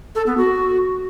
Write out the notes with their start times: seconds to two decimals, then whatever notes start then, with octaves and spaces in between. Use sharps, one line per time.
0.15 A4
0.26 B3
0.38 F#4